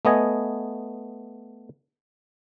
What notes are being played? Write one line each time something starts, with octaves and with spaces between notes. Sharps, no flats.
A3 B3 D#5 G#5